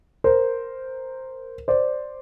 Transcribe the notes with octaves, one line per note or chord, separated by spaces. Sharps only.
A#4 C5
C5 D5